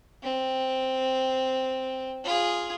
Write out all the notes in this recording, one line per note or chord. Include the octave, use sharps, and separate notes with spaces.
C4
F4 G#4